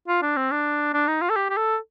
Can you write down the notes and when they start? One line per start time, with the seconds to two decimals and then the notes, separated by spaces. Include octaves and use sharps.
0.08 F4
0.22 D4
0.37 C4
0.52 D4
0.94 D4
1.08 D#4
1.22 F4
1.30 A4
1.36 G4
1.50 G4
1.57 A4